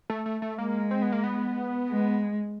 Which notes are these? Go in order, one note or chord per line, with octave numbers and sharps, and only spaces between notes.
A3
A3
A3
G#3 A#3
C4
B3
A#3
B3
G#3